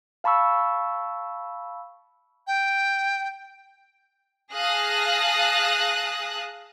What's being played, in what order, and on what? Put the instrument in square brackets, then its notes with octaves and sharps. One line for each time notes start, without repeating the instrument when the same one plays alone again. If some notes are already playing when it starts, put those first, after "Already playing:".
[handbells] F5 A5 B5 C#6 E6
[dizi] G5
[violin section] G#4 F5 A5 D#6 F#6 A#6